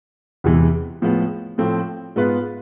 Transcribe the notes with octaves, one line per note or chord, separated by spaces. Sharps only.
E2 C3 E3 G#3
A2 F3 G#3 B3
A2 F3 A3 C4
G#2 G#3 B3 F4 B4